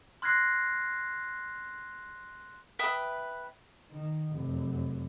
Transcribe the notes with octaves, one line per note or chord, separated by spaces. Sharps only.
C6 F6 F#6 G#6 A#6 C7
B4 E5 G5 D#6
D#3
F1 F#2